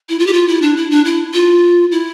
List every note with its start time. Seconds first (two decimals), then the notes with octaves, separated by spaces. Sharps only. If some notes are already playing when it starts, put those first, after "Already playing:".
0.09 E4
0.19 F4
0.27 G4
0.33 F4
0.48 E4
0.62 D4
0.77 E4
0.91 D4
1.05 E4
1.34 F4
1.92 E4